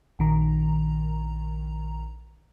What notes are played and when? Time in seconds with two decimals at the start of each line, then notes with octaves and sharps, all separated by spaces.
0.19 A#1 D#3 A#5